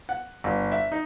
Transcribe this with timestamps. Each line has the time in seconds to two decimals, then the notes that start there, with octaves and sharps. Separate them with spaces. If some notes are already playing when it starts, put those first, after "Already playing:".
0.09 F#5
0.44 G1
0.72 E5
0.92 D#4